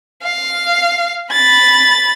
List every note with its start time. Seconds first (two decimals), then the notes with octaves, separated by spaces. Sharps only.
0.23 F5
1.32 B5 A6